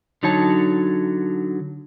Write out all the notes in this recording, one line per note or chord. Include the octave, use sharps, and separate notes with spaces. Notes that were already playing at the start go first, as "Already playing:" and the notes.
D3 F#3 D#4 C#5 A5